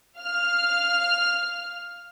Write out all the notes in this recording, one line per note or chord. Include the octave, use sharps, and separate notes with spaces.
F5 F6